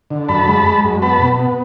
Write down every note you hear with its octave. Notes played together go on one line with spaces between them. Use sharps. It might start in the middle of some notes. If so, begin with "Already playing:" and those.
D3
F#2 A5 B5
G#3
G#3
F#2
B3 A5 B5
B2
B3